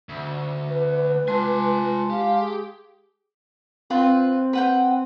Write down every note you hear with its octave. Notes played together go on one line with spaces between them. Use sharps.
D2
B4
G#3 F4 G#5 A5 C6
G4 F5
G#4
C4 F4 B4 B5
B4 F#5 G5